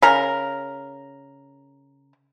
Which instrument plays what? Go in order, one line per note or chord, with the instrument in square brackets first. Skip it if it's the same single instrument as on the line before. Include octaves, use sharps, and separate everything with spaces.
[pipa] C#3 A#4